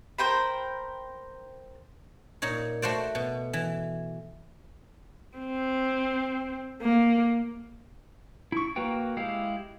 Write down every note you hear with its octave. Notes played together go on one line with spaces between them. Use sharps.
A#4 C5 G5 B5
A#2 D#4 C#5
A3 F#4 C5 D5
B2
E3
C4
A#3
E4 C#6
A#3 F#4 A#4 B4 G5
G#3 E4 G4 F5